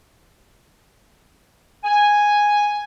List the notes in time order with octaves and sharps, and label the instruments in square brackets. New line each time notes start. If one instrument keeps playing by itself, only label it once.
[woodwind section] G#5